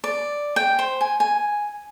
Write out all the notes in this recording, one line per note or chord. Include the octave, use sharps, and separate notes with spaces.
D5
G5
C5
G#5
G#5